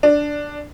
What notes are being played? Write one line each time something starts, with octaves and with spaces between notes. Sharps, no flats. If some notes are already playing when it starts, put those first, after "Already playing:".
D4